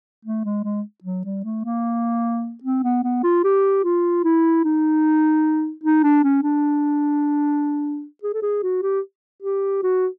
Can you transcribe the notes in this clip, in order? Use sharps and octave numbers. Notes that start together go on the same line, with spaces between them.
A3
G#3
G#3
F#3
G3
A3
A#3
C4
B3
B3
F4
G4
F4
E4
D#4
D#4
D4
C#4
D4
G#4
A4
G#4
F#4
G4
G4
F#4